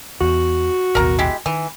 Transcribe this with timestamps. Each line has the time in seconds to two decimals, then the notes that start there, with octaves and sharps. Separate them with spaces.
0.21 E2 F#4
0.95 A1 D#2 B2 A#4 A#5
1.19 G#3 E4 G4
1.46 D#3 E3